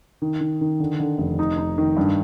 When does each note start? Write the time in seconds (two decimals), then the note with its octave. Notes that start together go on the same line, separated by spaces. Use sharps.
0.22 D#3
0.40 D#3
0.61 D#3
0.80 D3
1.00 D3
1.18 F1
1.39 D#4
1.57 D#4
1.78 D#3
1.97 G2